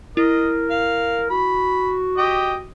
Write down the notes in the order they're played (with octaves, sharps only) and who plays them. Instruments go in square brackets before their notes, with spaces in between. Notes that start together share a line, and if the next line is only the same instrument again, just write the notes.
[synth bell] E4 [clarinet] A#4 [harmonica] D#5
[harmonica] F5
[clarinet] F#4 [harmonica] B5
[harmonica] G4 D#5 G5